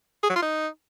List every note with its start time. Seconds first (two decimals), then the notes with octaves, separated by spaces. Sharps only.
0.23 G#4
0.30 F#3
0.36 F4
0.42 D#4